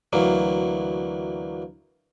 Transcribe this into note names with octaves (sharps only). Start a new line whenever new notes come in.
D2 E3 F#3 A#3